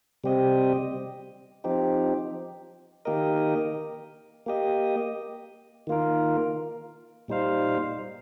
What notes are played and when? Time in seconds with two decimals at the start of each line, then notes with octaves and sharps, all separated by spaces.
0.24 C3 G3 C4 G4 D#5
1.64 F3 C4 D#4 G4
3.05 D#3 A#3 G4 A#4 D#5
4.46 A#3 G4 D#5
5.87 D#3 A#3 F4 A#4
7.28 A#2 G3 D#4 C5 F5